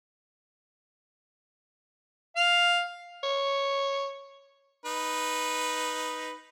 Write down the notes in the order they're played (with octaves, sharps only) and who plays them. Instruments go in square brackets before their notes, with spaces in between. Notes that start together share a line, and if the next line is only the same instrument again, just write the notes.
[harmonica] F5
[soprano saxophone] C#5
[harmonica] D#4 B4